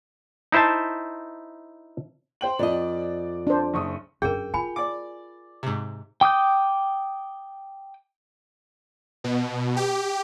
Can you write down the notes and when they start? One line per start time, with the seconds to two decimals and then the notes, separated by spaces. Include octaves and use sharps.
0.52 D#4 E4 C5 E5 A5
2.41 C5 G5 F#7
2.59 F2 D5 D#5
3.47 D4 C5
3.74 F#1 C#6 D#6
4.22 F#2 D4 G#4 A#4 G5
4.54 F4 G#5 B5
4.76 D5 D6
5.63 G#2 C3
6.21 G5 D6 D#6 G6
9.24 B2
9.76 G4